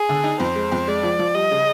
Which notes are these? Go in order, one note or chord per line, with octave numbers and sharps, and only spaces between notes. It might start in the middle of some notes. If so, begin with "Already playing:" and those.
Already playing: G#4
D3
D#4
F2 C5
G#3
F2
G#3 D5
F3
F3
G3 D#5
C#3